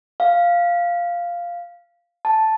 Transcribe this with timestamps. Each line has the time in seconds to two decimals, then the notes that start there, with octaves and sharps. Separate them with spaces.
0.20 F5
2.25 A5